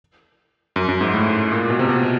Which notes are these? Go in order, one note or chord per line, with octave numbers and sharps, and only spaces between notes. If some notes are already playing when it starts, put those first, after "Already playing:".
F#2
F#2
G#2
A2
A#2
B2
C3
B2